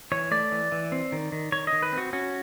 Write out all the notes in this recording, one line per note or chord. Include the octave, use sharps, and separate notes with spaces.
E3 C#5
A3 D5
E3
E3
C4
D#3
D#3
D#3 C#5
D#5
D#3
B4
C4
F#4
C#4 F#4